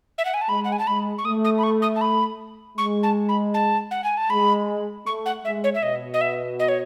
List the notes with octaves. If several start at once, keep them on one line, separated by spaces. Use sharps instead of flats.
E5
F#5
G#5
A5
G#3 B5
F#5
G#5
A5
G#3 B5
C#6
A3 D#6
D#6
B5
C#6
D#6
A5
B5
G#3 C#6
A5
B5
A5
F#5
G#5
A5
G#3 B5
A3 C#6
F#5
G#3 E5
C#5
E5
B2 D#5
D#5
E5
D#5
C#5